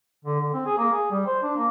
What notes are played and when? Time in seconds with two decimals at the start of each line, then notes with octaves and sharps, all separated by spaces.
0.25 D3
0.40 D3
0.53 C4
0.66 G#4
0.77 A#3
0.92 G#4
1.11 G3
1.26 C5
1.43 D4
1.56 A#3